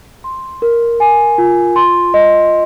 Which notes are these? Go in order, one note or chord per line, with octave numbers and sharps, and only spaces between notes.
C6
A#4
G#5
F4
C6
D#5